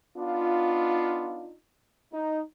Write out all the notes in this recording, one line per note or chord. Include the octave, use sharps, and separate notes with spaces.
B3 D4 D#4 F4
D#4